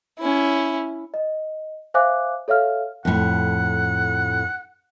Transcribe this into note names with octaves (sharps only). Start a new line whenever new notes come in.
C#4 E4
D#5
C5 E5 F5 G#5 D6 F#6
A4 C#5 E5 F5 F6
F2 A2 F#5